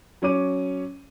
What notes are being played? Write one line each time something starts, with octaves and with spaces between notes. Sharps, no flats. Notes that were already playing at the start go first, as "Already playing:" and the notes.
F#3 C#4 C#5 D6 D#7